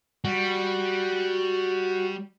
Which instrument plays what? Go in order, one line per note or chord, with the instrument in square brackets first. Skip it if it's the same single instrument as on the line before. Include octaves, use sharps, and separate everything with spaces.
[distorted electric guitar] G3 [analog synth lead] F#4